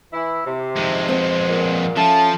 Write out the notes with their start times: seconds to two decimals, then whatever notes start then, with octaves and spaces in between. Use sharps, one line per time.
0.12 E3 E4
0.46 C3
0.77 F2 D#3 G#3
1.08 B3 C4 C5
1.47 A#2
1.97 F3 C#4 A4 E5 F5 A5